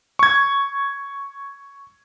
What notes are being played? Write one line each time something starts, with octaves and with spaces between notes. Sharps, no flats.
C#6 G#6